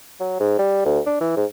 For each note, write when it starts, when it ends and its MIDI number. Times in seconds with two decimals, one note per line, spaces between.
0.20 0.37 54
0.39 0.54 44
0.59 0.85 55
0.85 1.00 38
1.06 1.17 62
1.20 1.32 52
1.36 1.45 44